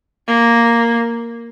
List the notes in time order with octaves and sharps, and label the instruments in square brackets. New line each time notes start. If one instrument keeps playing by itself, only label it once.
[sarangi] A#3